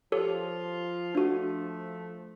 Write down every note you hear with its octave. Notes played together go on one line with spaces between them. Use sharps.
F3 F4 G4 A4 C#5
F3 A3 D4 F#4